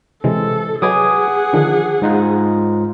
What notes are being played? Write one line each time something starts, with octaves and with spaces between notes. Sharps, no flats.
C3 E3 G#3 A4
F#3 G#4 B4 D#5 F#5 G#5 D6 D#6
D3 D#3 F3
G#2 D#4 F4